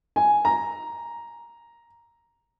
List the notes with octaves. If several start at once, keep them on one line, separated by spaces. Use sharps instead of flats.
G#5
A#5